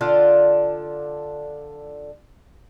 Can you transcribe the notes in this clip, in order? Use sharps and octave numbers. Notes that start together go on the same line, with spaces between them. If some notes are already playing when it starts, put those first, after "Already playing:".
D3 D4 F4